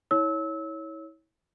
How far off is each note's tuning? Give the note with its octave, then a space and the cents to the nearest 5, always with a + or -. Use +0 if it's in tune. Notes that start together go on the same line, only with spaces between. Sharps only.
E4 -35 C#5 +0 E6 -25